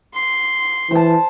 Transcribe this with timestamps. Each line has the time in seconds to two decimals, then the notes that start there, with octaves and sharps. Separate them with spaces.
0.14 C6
0.91 E3 C5 A5